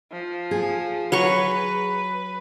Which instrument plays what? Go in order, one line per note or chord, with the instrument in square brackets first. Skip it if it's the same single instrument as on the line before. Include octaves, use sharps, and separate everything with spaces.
[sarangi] F3
[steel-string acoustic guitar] G#4
[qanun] F#3 C#5 C#6 [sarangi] B4